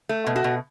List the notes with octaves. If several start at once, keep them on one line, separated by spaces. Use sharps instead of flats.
A3
B2
F#4
B2